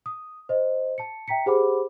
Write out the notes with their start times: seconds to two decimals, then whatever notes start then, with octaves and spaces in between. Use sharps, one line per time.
0.06 D#6
0.49 C5 D#5
0.98 A5 C#7
1.28 E5 G5 A#5 B6 C#7
1.46 G4 G#4 C5 F#5 B5 D6